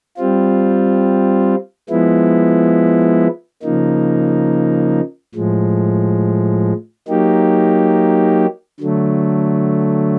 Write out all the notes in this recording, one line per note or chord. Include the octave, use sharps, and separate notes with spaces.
G3 C4 F4
F3 G#3 B3 E4
C#3 F3 A#3 D#4
A2 F3 G#3
F#3 A#3 D#4 G4
D3 F#3 A3